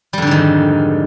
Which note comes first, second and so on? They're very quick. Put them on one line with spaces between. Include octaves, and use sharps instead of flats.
G3 F2 D3 G#2 D#3